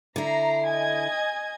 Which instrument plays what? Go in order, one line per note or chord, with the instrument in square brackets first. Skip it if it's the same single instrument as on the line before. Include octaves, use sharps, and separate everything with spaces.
[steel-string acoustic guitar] D3 E4 [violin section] A#5 C7
[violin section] D#5 G#5 G#6